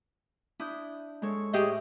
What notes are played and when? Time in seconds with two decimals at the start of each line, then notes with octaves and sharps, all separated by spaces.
0.60 D4 E4 D#6 G6
1.22 G#3 A4 C#5
1.53 A2 G4 G#4 D#5 E5